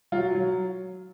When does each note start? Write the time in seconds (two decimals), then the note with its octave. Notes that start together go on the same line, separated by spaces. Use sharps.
0.12 F#3 F4
0.35 F#3